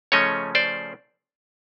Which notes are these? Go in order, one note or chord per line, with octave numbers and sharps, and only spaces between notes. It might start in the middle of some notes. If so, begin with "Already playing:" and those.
C#3 F3 A3 C#4 C#5 D#5
C5 D5